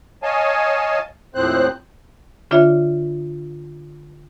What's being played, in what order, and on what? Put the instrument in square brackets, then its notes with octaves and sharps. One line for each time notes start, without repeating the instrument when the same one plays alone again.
[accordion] C#5 D#5 F5 G#5 A5
D#2 A2 F3 C4 C5 F#6
[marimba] D3 D4 F4 C#5 D5 E5